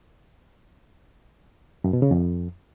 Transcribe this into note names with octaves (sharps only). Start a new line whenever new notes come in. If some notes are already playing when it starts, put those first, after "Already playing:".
F#2
B2
C#3
F2